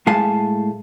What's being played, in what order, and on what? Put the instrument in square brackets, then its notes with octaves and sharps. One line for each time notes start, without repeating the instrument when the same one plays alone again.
[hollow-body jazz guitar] A2 G#3 F5 G#5 A5